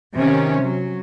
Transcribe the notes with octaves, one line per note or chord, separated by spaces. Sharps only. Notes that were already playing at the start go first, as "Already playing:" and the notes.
C3 D#3 C#4
F#3